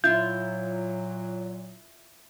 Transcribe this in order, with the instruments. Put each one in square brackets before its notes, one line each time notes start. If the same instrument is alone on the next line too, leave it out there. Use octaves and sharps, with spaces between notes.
[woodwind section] A#2 F#3 [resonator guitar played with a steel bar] E4 F4 [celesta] G6